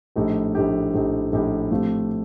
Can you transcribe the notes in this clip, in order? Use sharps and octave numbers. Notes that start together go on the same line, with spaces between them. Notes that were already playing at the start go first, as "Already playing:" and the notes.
A#1 A2 A3 D#4 G4
A#1 A2 A3 D#4 G4
A#1 A2 A3 D#4 G4
A#1 A2 A3 D#4 G4
A2 F3 A3 C4 G4